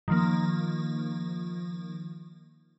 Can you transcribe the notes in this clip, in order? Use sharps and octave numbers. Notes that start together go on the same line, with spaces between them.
D#3 F3 A#3